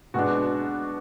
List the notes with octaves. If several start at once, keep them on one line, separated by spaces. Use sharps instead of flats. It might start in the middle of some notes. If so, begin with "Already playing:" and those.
B2 G#3 B3 D4 F#4